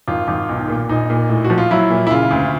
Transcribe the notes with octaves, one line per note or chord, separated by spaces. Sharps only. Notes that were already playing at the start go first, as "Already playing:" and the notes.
G#1 F4
G#1
B1
A#2
A#1 D#4
A#2
A2
F#4
F3
F4
F#3 E4
A#2
E4
C#3 F4
D2